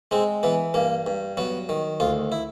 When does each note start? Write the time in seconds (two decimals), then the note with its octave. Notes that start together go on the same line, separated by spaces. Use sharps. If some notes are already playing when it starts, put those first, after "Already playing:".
0.11 G#3 C4
0.43 E3 B3
0.74 G2 A#3
1.07 G2
1.37 F#3 B3
1.69 D#3
2.00 D2 F4
2.32 E4